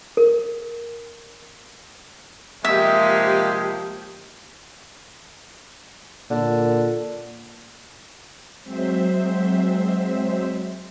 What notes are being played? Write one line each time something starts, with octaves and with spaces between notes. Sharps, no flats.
A#4
C3 F3 G#3 A#3 G4 E5
A#2 D3
F#3 G#3 C4 C5 E5